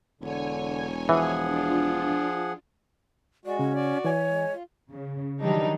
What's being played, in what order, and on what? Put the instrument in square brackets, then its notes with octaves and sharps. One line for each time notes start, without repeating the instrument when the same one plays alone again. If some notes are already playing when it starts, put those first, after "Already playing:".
[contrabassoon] E1 [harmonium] D3 [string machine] C#5 G#5
[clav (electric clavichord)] E3 [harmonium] F3 G#4 F#5
[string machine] D4 F4
[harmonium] G#3 F#4 [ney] D5
[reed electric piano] C#3 [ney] C#4
[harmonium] F#4 D5
[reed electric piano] E3 G#5 [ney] C#5
[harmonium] G#3
F4
[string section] C#3
D#3 E3 F#3 G3 D4 D#4